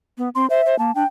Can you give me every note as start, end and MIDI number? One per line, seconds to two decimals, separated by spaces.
0.18 0.29 59
0.35 0.49 60
0.35 0.46 84
0.50 0.61 72
0.50 0.78 76
0.66 0.77 72
0.79 0.91 58
0.79 0.94 81
0.95 1.03 62
0.95 1.07 79